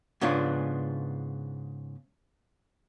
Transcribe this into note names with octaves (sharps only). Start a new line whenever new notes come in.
G#2 C#3 B3 D4 F4